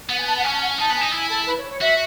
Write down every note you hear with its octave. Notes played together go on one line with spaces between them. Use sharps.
B3 F#5
G#5
A5
F#5
C#4 G#5
A5
F#5
G#5
D#4 A5
B3 G#5
D#4
E4 G#5
A4
B4
C#5
C#5
F#4 E5